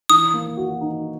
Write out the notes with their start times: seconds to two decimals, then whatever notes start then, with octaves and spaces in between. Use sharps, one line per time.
0.10 E3 D#6
0.34 A#3
0.57 F#4
0.81 D#4